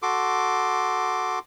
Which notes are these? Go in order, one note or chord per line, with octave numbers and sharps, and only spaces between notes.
F#4 A4 C6 D6